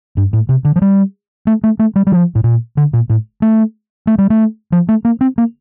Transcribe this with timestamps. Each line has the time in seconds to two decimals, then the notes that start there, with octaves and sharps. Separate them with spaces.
0.17 G2
0.33 A2
0.49 C3
0.65 D3
0.76 F3
0.82 G3
1.47 A3
1.64 A3
1.79 A3
1.96 G3
2.07 G3
2.12 F3
2.35 A2
2.44 A#2
2.77 D3
2.93 A#2
3.10 A2
3.42 A3
4.07 A3
4.18 G3
4.30 A3
4.72 F3
4.89 A3
5.05 A#3
5.21 C4
5.38 A#3